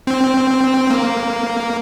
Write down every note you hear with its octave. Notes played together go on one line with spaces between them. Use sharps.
C4
A#3